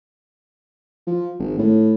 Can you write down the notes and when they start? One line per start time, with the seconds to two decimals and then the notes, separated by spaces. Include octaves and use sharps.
1.07 F3
1.39 G#1
1.59 A2